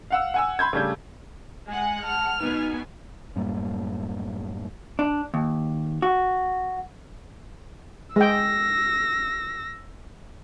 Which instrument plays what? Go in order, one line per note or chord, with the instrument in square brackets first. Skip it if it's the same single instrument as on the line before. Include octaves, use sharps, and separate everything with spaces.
[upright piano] F5 F#5 E6
F#5 G#5 E6
B5 C6 G6 G#6
C#3 G3 A3 D4 G6
[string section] G#3 F#5 [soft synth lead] G#5
[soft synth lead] A5 [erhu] F6
[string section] B2 B3 G#5 [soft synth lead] D#4
[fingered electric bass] F#2 A2 G3 A#3
[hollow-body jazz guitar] D4
D#2
F#4
[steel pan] G#3 G5 [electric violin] E6 A#6